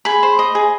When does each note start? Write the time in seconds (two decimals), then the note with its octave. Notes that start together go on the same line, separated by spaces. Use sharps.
0.05 G#4 B5
0.23 C5
0.39 D#5
0.55 G#4